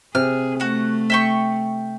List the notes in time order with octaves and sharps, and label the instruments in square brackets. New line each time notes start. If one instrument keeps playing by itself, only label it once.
[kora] C3 [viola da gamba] G#4 [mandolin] F6
[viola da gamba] A3 [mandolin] F#4 F#5
[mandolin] E5 G5 C#6